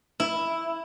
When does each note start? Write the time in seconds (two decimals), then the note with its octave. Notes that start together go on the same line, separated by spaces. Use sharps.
0.20 E4